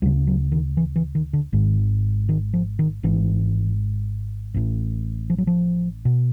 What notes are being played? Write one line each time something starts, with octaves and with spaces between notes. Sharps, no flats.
D2 C#3 G3
F#3
D#3
E3
E3
D#3
D3
G#1 G#2 D#3
D#3
F3
D#3
G#1 G#2 E3
A1 A2
F3
F#3
F3
B2